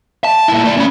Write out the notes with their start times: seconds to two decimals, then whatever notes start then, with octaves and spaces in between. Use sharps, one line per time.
0.24 A5
0.48 A#2 E4
0.64 A3 D5
0.77 C#4 B5